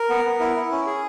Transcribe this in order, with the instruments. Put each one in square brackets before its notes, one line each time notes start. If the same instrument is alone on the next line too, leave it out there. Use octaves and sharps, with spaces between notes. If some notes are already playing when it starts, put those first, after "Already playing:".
Already playing: [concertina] A#4
B3
B3
E4
E4
C#4
G#4